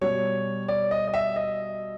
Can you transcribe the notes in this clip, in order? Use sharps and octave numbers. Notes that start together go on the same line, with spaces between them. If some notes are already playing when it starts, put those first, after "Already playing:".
B2 G3 C#5
D5
D#5
D#5
E5
D#5